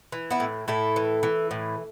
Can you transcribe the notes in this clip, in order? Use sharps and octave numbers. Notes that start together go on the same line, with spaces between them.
E3
B3 E4
A2
A2 E4 A4
E3
E3
A2